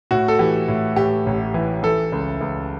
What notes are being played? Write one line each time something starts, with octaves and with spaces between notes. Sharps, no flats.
A2 F#4
A4
E3 G4
A2
A2 G4
A1
E3
E3 A4
C#2
C#2